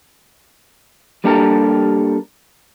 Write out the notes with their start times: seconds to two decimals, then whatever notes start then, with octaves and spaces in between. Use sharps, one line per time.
1.24 G3 A#3 D4 G4 A4 A#4